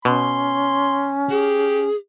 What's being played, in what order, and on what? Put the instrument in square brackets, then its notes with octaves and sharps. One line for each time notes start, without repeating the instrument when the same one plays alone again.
[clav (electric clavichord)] B2 [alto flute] C#4 [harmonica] C6
[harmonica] G4 [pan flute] G#4